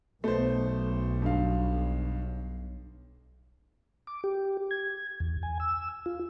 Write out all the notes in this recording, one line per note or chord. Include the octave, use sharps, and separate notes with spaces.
B1 A3 B3 C5
G2 F5
D6
G4
G#6
E2
G#5
E6
F4